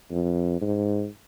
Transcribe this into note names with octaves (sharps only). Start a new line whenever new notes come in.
F2
G#2